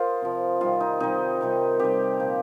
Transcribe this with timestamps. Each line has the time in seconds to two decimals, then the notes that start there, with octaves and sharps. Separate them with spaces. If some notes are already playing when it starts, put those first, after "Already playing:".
Already playing: F4 A#4 C5 D#5
0.22 C3 F3
0.61 C3 D#3 G3 F4
0.80 D#4
1.00 C3 D#3 G3 D#4
1.41 C3 D#3 G3
1.79 C3 D#3 G3 G4
2.19 A#2 F3